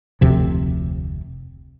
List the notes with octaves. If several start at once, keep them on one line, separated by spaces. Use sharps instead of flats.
F1 D2 C3 F3